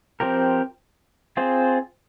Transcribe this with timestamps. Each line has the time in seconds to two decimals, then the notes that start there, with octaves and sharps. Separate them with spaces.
0.20 F3 C4 G4 A#4
1.37 C4 F4 G#4 C5